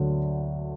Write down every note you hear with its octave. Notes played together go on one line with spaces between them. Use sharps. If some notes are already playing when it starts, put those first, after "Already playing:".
Already playing: D2 D3 F#3